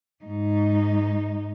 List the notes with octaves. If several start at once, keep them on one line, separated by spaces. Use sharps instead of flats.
G#2 D#4